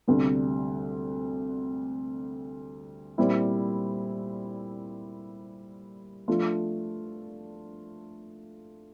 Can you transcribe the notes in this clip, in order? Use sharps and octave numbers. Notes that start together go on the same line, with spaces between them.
D2 C3 G3
A#2 G3 C4 E4
F3 A3 D4 F4